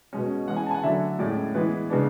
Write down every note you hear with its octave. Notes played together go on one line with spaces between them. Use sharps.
B2 G#3 C#4
E3 G#3 C#4 F#5
G#5
G#5 A5
F#5
D3 F#3 A3 D4 E5
A2 G#3 C#4 D5
E3 G#3 B3 B4
C#3 G#3 B3 D4